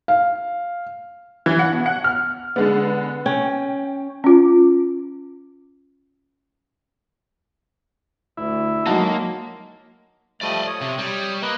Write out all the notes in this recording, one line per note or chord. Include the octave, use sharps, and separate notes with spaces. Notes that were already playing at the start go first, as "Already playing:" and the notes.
F5
E3
F#5
B2
F#5
F6
D3 G#3 B3
C#4 G5
C#4 F4
D2 E4
F#3 G#3 A#3 D#4 F#4 A5
F3 G3 A3 D5 D#5
C#5 D#6
C3
G3
A#3 B4 D#5